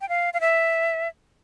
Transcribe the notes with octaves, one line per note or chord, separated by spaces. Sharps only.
G5
F5
F5
E5